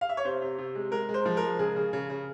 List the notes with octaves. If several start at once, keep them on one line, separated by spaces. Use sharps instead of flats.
F5
E5
C#5
C3 C5
C3
C3
G#3
G#3 A#4
G#3
C5
F3
A#4
G#3
C#3 G#4
C#3
C#3
C#3